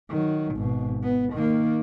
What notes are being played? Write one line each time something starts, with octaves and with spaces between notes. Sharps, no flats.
D#3 F#3
G#1 B2
B3
D#3 A#3